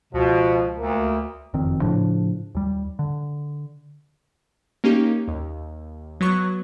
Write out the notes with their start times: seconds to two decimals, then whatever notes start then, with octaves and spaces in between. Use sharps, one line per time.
0.13 C#2 B2 F3
0.78 D2 A#3
1.54 F#1 F2 D#3 C4
1.81 A2 C#3 F3 D4
2.55 D#2 G3
2.99 D3
4.84 A#3 C#4 D#4 G4
5.28 D#2
6.21 F#3 B3 C#6 F#6